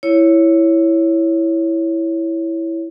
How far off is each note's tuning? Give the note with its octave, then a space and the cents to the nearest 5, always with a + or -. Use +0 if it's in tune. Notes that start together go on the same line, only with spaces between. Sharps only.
E4 +0 C#5 +0